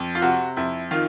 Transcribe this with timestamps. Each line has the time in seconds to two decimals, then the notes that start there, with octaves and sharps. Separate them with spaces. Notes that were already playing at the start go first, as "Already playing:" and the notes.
Already playing: F2
0.15 F4
0.22 C3 F#4
0.57 F2 E4
0.91 D#3 F4